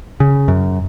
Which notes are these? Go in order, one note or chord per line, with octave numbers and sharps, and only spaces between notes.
C#3
F#2